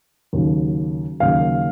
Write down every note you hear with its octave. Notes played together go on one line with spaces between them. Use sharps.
D#2 C#3 F#3
D#2 C#3 F#3 A#3 F5